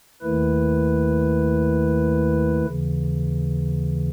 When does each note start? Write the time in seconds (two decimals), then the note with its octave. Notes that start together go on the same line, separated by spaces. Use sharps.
0.22 D#2 D#3 A3 E4 B4
2.66 D#2 C#3 E3